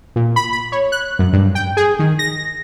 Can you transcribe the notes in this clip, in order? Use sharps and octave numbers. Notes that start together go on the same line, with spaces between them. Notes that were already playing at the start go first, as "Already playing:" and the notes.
A#2
B5
B5
C#5
F#6
F#2
G2
G5
G#4
D#3
A#6